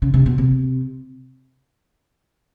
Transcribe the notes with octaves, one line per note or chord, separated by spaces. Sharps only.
C#3
C3
B2
C3